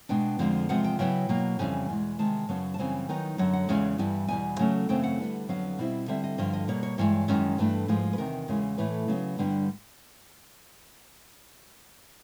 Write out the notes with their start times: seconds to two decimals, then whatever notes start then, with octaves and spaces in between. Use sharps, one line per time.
0.09 B2 G#3 B3 D4 G5
0.39 F2 D3 F3 G#3
0.69 E2 C3 F3 G#3 B3 F#5
0.84 G5
0.99 C#3 F#3 B3 E4 G5
1.29 B2 F#3 A#3
1.59 F2 C#3 E3 G3 G#5
1.89 E2 B2 G#3
2.19 C3 D#3 G#3 A5
2.49 F#2 C#3 F#3 B3
2.74 A5
2.78 F#2 C#3 E3 G3 C4 G#5
3.09 D#3 F#3 B3 D#4
3.38 F#2 D3 F#3 F#5
3.53 F#5
3.69 E2 C#3 E3 G#3 C#4
3.98 G2 E3 G3 B3
4.28 E2 B2 G3 G#5
4.59 C#3 F#3 A3 C#4
4.89 F#2 C#3 E3 A3 C4 G5
5.04 F#5
5.19 D3 G3 B3
5.48 F2 D3 F#3 B3 F5
5.79 B2 G3 C4 E4
6.08 D3 G3 C4 E5
6.24 D#5
6.38 G2 D3 F3 D#5
6.53 D#5
6.68 B2 G3 A#3 C#5
6.83 C#5
6.98 G2 E3 G#3 C#5
7.28 F#2 D#3 G#3 C#4
7.58 G2 E3 A3 D4 B4
7.88 G#2 F3 G#3
8.13 B4
8.18 E2 C3 D#3 A#4
8.48 E2 C#3 E3 G#3
8.78 A2 E3 A3 B4
9.08 C#3 F#3 B3
9.38 G2 D3 G3 B3 D4